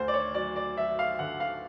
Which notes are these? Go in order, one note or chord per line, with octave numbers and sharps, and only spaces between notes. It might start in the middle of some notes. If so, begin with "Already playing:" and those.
Already playing: D2 C5
D5
C#5
F#3 D5
D5
F#3 E5
F5
D3 F#5
F5